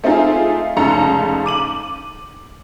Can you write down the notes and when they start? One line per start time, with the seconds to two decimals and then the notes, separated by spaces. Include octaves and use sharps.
0.04 A3 C4 D#4 F4 G#4
0.77 F1 G#2 C#3 A4 A#5 C#7
1.46 D6 D#7 F#7